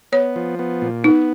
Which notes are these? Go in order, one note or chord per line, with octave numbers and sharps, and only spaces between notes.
B3 C#5
F3
B3
A#2
B3 D#4